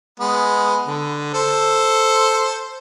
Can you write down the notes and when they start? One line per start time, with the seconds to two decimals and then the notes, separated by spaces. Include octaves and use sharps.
0.20 G#3 B3
0.87 D3
1.34 A4 C5